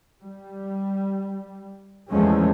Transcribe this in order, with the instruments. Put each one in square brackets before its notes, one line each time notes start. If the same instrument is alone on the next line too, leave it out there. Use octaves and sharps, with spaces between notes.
[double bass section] G3
E2 F3 G#3 A3 C#4